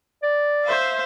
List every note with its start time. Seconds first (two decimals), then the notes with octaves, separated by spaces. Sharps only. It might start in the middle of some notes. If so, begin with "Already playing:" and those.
0.23 D5
0.65 C5 E5 F5